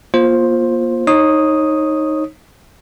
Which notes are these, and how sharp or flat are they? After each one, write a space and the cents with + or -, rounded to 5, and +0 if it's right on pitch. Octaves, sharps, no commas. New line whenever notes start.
A#3 +35 F4 +0 C5 +10
D#4 +0 C#5 -30 D#6 +0